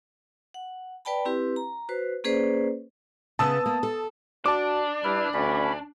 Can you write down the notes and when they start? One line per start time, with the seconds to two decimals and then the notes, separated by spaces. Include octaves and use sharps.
0.54 F#5
1.05 B4 D5 G5 A5 B5
1.25 C4 E4 G4 B4
1.56 A#5
1.89 F#4 B4 C5
2.24 A#3 C#4 G#4 B4 C5 D5
3.39 C#3 B3 A5 D#6 E6
3.66 A#3
3.83 A4
4.46 D4 F#4 A5 D6
5.04 G3 E4 B4 F6
5.34 D2 C#4 B5